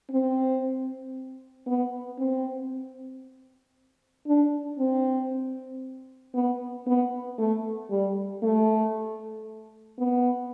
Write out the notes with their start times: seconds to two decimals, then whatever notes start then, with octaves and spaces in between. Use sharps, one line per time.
0.11 C4
1.67 B3
2.19 C4
4.26 D4
4.79 C4
6.34 B3
6.87 B3
7.38 A3
7.91 G3
8.43 A3
9.98 B3